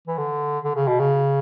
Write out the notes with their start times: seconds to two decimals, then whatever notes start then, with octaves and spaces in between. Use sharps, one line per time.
0.08 E3
0.18 D3
0.64 D3
0.76 C#3
0.87 B2
1.00 C#3